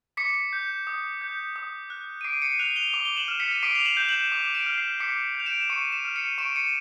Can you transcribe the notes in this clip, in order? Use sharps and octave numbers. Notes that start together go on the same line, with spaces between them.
D6 B6 C#7
G6
D#6
G6
D#6
F#6
D#7
D6 C7 D7
C#7 D#7
F#6 D#7 F7
F7 G7
D6 F7 G7
G7
E7 F#7
F6
B6 C#7
D#7
D6 C7 D7
F7
E7 F#7
G6
E7 F#7
D6
D7 E7
F6
C7
D6 B6 C#7
G6 F7
D7 E7
C#6 C#7 D#7
D7 E7
F6
C#7 D#7
C#6 D7 E7
C#7 D#7